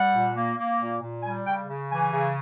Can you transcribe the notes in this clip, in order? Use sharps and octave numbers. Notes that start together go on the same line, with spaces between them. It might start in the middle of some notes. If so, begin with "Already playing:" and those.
Already playing: G3 F#5
A#2
A#3
A#3
A#2
A#2
G3 G#5
C#3 G5
C#3
E3 G#5
C#3